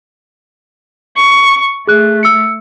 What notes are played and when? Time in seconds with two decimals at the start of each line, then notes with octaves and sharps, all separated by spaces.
1.16 C#6
1.87 A3 G#4 F#6
2.23 E6 C#7